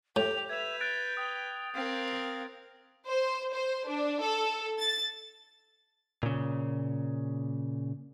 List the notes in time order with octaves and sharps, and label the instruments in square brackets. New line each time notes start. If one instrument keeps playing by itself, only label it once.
[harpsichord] A2 [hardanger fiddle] G4 [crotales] G6 [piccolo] F7
[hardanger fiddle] B4 [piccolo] E5 [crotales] G#6 F7
[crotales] F#6 A6 D7 [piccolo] G6
[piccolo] G5 [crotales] D#6
[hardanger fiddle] C4 A#4 [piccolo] F5
[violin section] C5
C5
D4
A4
A6
[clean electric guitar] A#2 C#3